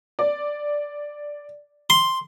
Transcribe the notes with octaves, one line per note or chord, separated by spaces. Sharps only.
D5
C6